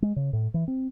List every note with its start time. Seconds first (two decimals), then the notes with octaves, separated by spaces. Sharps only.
0.02 G#3
0.16 C#3
0.33 A2
0.54 E3
0.68 C4